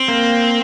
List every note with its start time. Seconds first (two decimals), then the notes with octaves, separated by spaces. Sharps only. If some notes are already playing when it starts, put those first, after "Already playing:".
Already playing: C4
0.08 A#3